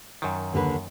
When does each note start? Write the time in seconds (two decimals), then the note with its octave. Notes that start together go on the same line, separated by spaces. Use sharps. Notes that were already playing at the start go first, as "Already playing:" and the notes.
0.22 F#2 D#3
0.53 D#2 D3 B4